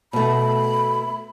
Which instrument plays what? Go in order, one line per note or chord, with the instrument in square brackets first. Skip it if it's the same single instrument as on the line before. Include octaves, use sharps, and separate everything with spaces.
[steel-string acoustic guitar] B2 A3 [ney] B5